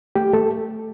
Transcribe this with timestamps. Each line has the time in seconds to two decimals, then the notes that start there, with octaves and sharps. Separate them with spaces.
0.15 A3 G4
0.33 A3 A4